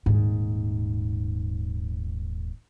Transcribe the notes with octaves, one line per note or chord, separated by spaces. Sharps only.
D#1 G#2